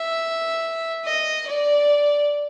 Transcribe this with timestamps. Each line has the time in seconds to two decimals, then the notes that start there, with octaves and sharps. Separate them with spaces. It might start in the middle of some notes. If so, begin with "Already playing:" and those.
Already playing: E5
1.04 D#5
1.47 D5